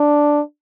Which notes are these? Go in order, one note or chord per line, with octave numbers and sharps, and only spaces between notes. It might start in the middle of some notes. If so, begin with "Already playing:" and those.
Already playing: D4